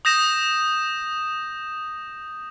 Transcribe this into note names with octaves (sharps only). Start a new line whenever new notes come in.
D#6 G6 A#6 E7